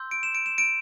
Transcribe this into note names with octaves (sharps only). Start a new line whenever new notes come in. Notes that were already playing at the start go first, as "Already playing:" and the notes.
Already playing: C6 E6 G6
D7
E7
D7
E7
D7